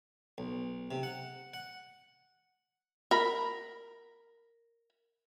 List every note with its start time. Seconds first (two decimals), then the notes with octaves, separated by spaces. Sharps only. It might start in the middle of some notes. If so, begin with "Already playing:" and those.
0.38 B1
0.91 C3
1.03 F#5
1.54 F#5
3.11 A#4 B5